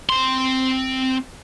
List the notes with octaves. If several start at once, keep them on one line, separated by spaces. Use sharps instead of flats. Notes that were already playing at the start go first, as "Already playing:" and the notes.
C4 C6